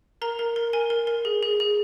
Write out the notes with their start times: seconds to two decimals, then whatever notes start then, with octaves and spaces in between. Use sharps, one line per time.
0.22 A#4 A#5
0.39 A#4
0.56 A#4
0.73 A#4 G#5
0.90 A#4
1.07 A#4
1.25 G#4
1.43 G#4
1.60 G#4